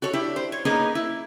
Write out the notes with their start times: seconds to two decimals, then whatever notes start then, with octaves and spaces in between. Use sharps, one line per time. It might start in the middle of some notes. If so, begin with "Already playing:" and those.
0.02 F#4 A4 C#5
0.13 D4 E4 G4
0.36 C5
0.52 C#5
0.65 A#3 B3 C#4 D#4 G#4 A#4
0.95 E4